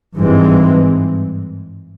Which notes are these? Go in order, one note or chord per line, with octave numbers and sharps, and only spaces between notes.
G#1 G2 E3 G#3 C4